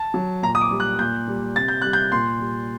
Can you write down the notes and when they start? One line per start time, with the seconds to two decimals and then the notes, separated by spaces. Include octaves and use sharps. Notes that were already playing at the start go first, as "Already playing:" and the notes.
Already playing: A5
0.14 F#3
0.42 A#2 A#5
0.55 D#6
0.61 D6
0.71 G3
0.80 F#6
0.99 A#2 G6
1.28 G3
1.56 C3 A6
1.68 G6
1.82 G3 F#6
1.93 G6
2.12 A#2 C6
2.40 G3